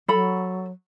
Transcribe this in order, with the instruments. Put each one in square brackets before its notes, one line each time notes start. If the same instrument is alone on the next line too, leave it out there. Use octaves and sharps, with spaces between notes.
[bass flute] F#3 [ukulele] A4 B5